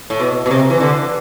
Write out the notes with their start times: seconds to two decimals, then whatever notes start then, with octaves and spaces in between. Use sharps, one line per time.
0.10 A2
0.20 B2
0.46 B2
0.51 C3
0.70 E3
0.80 D3